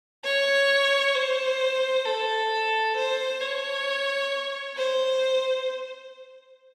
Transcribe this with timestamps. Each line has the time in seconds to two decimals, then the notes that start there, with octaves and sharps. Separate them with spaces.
0.24 C#5
1.15 C5
2.05 A4
2.96 C5
3.41 C#5
4.77 C5